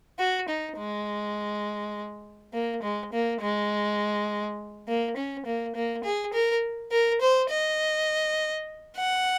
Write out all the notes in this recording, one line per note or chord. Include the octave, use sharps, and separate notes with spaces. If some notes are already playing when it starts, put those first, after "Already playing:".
F#4
D#4
G#3
A#3
G#3
A#3
G#3
A#3
C#4
A#3
A#3
G#4
A#4
A#4
C5
D#5
F#5